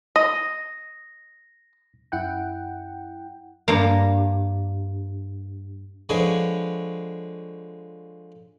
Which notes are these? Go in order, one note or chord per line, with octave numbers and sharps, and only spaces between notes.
D#5 A#6
F#2 E4 F#5 G5
G2 A#3
D3 F3 G#3 G#4 B4 C#5